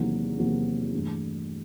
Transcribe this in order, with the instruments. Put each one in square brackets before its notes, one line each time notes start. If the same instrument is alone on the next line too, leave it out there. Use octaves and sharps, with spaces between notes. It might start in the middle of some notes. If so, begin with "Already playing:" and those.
Already playing: [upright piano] E2 C3 D#3 F#3 A#3
E2 C3 D#3 F#3 A#3
G2 E3 A3